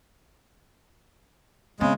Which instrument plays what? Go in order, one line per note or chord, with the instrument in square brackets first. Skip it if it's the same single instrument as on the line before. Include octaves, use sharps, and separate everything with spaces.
[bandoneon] C#3 G#3 [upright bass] B3 C4